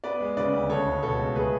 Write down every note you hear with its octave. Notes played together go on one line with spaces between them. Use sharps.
B3 B4 D5
G#3
C#3 B4 D5
D2
C#2 A4 C#5
G#3
B2 A4 C#5
C#2
A3 G#4 B4